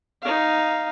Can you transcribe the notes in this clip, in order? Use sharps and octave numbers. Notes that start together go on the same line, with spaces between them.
D#4 F5